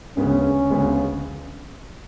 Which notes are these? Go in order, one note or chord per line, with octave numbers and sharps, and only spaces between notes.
D2 C#3 G#3 B3 C#4
D2 C#3 G#3 B3